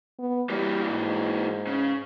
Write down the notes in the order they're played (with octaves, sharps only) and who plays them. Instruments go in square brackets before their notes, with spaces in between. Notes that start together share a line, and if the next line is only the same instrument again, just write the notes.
[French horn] B3
[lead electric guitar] E3 A#3 [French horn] G3
[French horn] G#2
[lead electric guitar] C#3